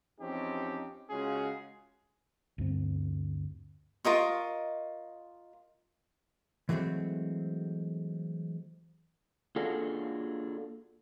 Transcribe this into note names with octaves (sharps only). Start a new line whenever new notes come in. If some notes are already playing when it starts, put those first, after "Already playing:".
E2 F3 C4 C#4 D#4 G4
C#3 G#3 C#4 F4 F#4 G#4
D2 G2 C4
F4 A#4 D#5 C#6
E3 F#3 G#3 A3 C4
A#3 D4 F4 F#4 G#4 A4